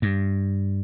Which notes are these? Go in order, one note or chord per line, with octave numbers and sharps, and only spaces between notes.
G2